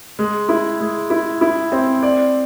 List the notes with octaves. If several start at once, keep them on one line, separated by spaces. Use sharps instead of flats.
G#3
E4
G#3
E4
E4
C4
D5